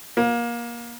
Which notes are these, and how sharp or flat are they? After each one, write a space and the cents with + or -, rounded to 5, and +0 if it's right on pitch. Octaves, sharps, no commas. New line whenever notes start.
A#3 +25